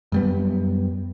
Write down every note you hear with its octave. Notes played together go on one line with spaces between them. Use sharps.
F#2 G3 B3